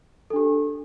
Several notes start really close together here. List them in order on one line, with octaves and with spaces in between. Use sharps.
A4 D4 G4